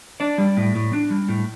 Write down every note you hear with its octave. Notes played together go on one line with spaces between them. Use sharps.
D4 D5
G3
A2
A2
D4
G3
A2